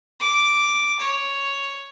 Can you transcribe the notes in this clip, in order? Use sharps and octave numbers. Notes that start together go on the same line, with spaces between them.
D6
C#5